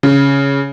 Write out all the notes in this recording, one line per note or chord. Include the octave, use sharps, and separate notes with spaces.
C#3